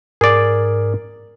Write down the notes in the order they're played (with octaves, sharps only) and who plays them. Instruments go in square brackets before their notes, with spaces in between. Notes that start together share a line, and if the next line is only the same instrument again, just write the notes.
[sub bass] G#2 [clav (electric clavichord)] G#4 D5 [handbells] A#4